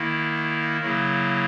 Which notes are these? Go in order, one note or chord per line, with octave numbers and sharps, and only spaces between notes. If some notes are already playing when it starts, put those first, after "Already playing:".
Already playing: D#3 A#3 E4
C#3 F#3 A#3 E4